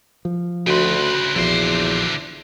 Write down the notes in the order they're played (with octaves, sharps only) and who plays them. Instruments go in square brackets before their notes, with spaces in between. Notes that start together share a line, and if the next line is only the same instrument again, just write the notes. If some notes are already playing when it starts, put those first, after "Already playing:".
[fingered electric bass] F3
[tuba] D2 [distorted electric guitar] C#3 B4 [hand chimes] F#4 C6
[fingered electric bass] A#1 F3 [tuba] E2 [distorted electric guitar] D3 C5